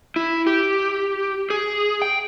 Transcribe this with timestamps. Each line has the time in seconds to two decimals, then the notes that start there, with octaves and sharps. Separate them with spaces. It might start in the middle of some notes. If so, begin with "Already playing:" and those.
0.16 E4
0.47 G4
1.50 G#4
2.02 G5